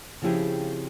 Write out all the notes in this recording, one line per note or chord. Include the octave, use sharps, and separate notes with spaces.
C#3 F3 C4 E4 G4 G#4